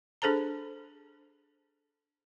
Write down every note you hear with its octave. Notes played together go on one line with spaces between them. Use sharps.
D4 G#4 A4 C5 A5 A#5